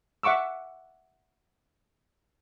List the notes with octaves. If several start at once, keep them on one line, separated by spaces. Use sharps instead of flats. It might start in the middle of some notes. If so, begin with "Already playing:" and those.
E5 F#5 C#6 D6 E6